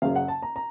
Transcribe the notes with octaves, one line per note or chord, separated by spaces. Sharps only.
F#1 F#2 C#3 F5
F#5
A5
A#5
A#5